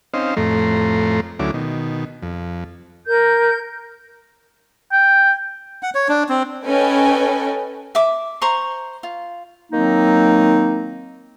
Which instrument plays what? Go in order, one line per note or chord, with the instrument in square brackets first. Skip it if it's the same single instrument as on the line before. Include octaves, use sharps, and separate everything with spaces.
[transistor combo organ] C4 C#4 D#4 C5 D#5 F5
F2 A2 A3 A#5 C6
D2 F#3 A3 C#4 E4 D6
B2 D#3
F2
[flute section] A#4 G6
[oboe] G5
[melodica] F#5
C#5
D4
C4
[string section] C#4 A4 B4 D#5 G5 G#5
[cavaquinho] E5 D6
C5 A#5 C6 C#6
F4
[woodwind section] D#3 F#3 A#3 C4 D#4